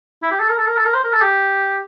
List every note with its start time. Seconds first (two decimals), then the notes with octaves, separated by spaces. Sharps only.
0.23 E4
0.31 G4
0.40 A4
0.49 A#4
0.58 A4
0.67 A#4
0.77 A4
0.85 A#4
0.94 C5
1.04 A#4
1.13 A4
1.22 G4